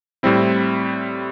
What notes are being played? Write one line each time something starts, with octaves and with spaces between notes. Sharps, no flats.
A2 G3 C4 E4